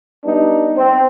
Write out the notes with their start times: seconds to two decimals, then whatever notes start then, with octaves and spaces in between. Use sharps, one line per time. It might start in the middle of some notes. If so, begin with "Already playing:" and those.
0.24 G3 B3 D4 D#4
0.76 C4